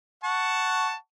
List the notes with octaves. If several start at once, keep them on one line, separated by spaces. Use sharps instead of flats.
F#5 A5 C#6